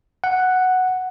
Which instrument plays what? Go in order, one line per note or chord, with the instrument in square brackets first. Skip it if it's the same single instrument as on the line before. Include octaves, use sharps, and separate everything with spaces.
[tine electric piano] F#5